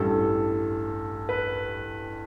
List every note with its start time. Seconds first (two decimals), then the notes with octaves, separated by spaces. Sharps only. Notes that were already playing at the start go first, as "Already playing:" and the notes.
Already playing: A1 G2 E3 G3 A4
1.29 B4